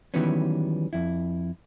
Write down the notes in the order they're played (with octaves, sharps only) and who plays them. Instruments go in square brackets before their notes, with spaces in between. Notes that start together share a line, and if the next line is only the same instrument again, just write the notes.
[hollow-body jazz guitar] D#3 E3 F#3 G3 B3 C#4
F2 E4